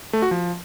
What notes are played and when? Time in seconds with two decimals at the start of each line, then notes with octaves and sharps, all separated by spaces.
0.13 A3
0.22 F#4
0.31 F3